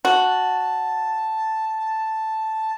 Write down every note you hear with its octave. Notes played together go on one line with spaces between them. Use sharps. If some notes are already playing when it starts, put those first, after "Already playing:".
F#4 A5